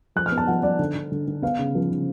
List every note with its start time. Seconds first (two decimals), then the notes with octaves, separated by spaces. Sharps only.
0.16 F3 F#6
0.26 F6
0.32 B3
0.38 A5
0.47 F3 F#5
0.63 F3 D5
0.79 D3
0.95 D3
1.12 D3
1.27 D3
1.42 B3 F5
1.59 C#3
1.75 F3
1.91 C#3